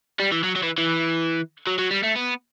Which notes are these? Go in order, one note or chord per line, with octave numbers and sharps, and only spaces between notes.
G3
E3
F#3
F#3
E3
E3
F#3
F#3
G3
A3
B3